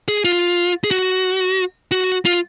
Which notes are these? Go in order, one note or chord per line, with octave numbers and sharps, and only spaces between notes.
G#4
F4
G#4
F#4
F#4
F4